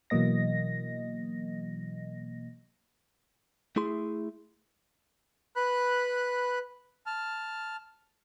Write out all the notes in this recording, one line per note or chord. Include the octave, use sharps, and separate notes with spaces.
B2 E3 F#3 A#3 D#5 A#6
A3 E4 G#4 C6
B4 B5 F#6
A5 F6